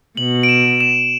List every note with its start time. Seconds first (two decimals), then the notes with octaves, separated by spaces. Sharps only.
0.17 B2 F#7
0.43 D7
0.49 E7
0.81 E7